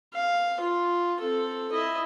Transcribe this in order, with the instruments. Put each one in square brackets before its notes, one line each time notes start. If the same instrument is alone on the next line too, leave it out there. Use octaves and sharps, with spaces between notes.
[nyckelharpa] F5
F4
C4 A4
E4 D#5